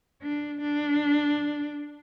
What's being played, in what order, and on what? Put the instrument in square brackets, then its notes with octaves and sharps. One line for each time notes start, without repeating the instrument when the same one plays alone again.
[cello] D4
D4